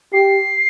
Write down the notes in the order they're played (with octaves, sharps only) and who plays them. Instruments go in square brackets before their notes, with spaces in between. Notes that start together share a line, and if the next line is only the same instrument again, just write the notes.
[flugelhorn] G4 [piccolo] C7